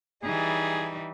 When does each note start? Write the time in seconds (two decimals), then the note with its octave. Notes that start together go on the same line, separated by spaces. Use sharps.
0.23 E3 G3 D#4 G#4